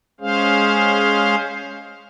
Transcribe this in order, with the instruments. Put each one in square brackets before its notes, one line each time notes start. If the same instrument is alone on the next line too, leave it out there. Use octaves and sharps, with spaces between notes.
[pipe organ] G#3 C#4 G#4 C5 F5